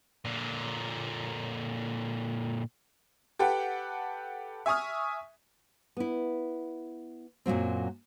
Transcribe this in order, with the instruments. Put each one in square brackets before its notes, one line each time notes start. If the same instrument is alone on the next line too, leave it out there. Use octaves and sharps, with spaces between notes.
[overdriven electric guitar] A#2 D3
[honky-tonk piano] G4 A4 B4 F#5 G5
E5 G#5 C#6 D#6 F6
[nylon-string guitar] B3 E4
F#2 A#2 F#3 C4